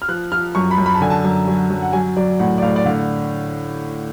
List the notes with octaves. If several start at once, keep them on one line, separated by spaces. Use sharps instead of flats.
F6
F3 F#6
F3 F6
F#2 C#6
B5
F#2
B5
A5
D3 G#5
A5
F#2
F#3
F#2
F#5
F#3 G#5
F#3 D5
A2 F#5
D5
A2 F5
D5
D3 F5